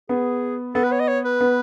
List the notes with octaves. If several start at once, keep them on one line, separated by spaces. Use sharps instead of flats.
B3 G#4
B3 A4
B4
C#5
D#5
C#5
B4
B3